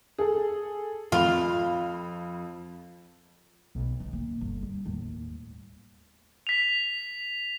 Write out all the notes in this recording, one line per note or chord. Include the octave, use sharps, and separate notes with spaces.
G#4 A4
F2 F4 B5
B1
C#3
A#3
G1
G3
D#2 A2
B6 F7